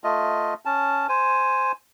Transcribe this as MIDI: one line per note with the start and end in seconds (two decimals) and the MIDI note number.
0.04 0.54 57
0.04 0.54 65
0.04 0.54 75
0.65 1.07 61
0.65 1.07 81
1.09 1.72 72
1.09 1.72 80